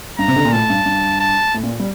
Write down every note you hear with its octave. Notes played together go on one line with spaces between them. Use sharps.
G2 A#5
C3
D3
A#2
A2 A5
G2
G2
A5
A2
A#2
G3